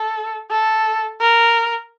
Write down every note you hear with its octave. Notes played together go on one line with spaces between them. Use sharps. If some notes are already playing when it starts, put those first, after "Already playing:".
Already playing: A4
A4
A#4